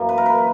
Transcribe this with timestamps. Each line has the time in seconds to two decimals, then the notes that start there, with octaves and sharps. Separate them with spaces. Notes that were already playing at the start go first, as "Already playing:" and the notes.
Already playing: F#2 E3 A#3
0.09 B4
0.18 A#4
0.26 B4